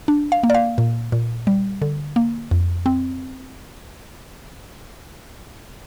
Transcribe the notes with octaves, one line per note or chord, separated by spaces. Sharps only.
D4
F5
A#3
D5
F5
A#2
A#2
G3
D3
A#3
F2
C4